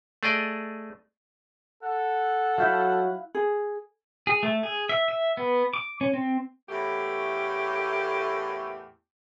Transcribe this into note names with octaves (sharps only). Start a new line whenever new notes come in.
A3 G#4 D5 D#5
A4 F#5
F#3 E4 E5 F5 G6
G#4
G#4
A3
G#4
E5
E5
B3
D6
C#4
C4
E2 A2 A3 A#3 G4